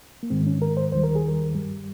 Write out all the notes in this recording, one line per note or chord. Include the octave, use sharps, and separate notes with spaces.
A#3
G#2 D#3 G#3 C4
C#4
A#4
C5
D#2 D#3 G3 C5
A#4
G#4
A#4
G2 G3